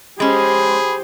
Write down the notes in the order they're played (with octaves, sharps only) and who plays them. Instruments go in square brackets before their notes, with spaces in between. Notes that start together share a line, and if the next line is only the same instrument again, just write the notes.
[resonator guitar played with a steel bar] G#3 C#4 [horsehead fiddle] G4 C5 [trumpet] G#4 [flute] B5